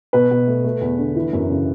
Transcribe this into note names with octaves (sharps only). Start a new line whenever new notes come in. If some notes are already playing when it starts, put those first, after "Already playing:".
B2 B4
B2
A3
A3
E2
D3
E3
F#2
C#3